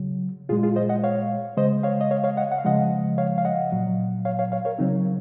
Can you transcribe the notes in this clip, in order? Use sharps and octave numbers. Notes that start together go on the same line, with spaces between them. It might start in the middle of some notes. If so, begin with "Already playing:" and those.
Already playing: C#3 F#3
A#2 G#3 F4 G#4
F4 G#4
C5 D#5
D#5 F#5
C#5 F5
C#3 G#3 C5 D#5
C#5 F5
D#5
C#5 F5
C#5 F5
D#5 F#5
F#5
F5
C#3 F3 G#3 D#5 F#5
C#5 F5
F5
D#5 F#5
A#2 F#3
C#5 F5
C#5 F5
C#5 F5
A#4 C#5
C#3 F#3 C4 D#4